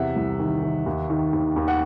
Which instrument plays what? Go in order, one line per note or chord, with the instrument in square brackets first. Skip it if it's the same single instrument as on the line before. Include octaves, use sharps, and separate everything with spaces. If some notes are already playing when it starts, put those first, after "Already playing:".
Already playing: [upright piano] E2 C3 E5 F#5
C2
D#3
D#3
D#2
D#3
D#2
D#2
F#5